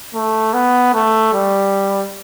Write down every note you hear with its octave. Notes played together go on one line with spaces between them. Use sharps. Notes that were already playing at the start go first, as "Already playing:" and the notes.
A3
B3
A3
G3